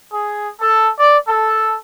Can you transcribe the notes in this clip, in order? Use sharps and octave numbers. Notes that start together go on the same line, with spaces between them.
G#4
A4
D5
A4